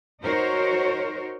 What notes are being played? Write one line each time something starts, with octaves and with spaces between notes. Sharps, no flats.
D#4 F#4 A#4 C5 C#5